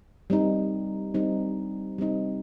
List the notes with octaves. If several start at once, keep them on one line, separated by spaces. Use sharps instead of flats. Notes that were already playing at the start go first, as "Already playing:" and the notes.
G3 C4 D#4
G3 C4 D#4
G3 C4 D#4